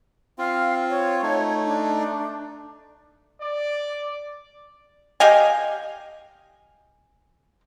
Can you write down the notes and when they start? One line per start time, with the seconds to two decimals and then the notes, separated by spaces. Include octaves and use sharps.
0.38 C4 F4 F5
0.90 C#5
1.23 A3 D#4
1.66 D4
3.41 D5
5.20 G4 D#5 F5 G#5